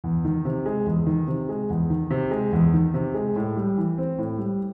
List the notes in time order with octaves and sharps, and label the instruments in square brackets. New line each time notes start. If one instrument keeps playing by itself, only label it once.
[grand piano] E2
D#3
C3
G#3
E2
D#3
C3
G#3
E2
D#3
C3
G#3
E2
D#3
C3
G#3
A2
G3
E3
C4
A2
G3